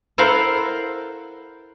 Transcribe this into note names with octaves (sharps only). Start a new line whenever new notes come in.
E4 A4 A#4 C5 F5 F#5